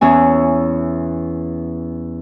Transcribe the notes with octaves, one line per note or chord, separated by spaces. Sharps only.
E2 E3 C#4 G#5